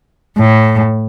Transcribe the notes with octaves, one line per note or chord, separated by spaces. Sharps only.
A2